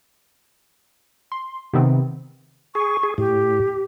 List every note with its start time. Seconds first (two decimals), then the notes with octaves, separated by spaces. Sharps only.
1.32 C6
1.73 C3 D#3 B3 C4
2.75 G#4 C#6
3.03 G#4
3.18 A2 G4